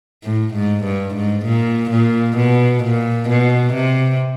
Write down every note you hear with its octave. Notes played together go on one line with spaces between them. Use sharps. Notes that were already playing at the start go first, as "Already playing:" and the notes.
A2
G#2
G2
G#2
A#2
A#2
B2
A#2
B2
C3